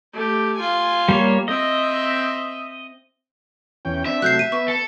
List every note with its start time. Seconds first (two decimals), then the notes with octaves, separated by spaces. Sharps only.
0.13 A3 G4
0.56 F4 G#5
1.09 G3 A#3 C#5
1.48 C4 D#5 E5
3.85 E2 C#4 G5
4.06 C4 D4 E5
4.22 C3 F#3 A3 F#6 G6 C7
4.39 D#7
4.52 B3 C#6
4.68 A4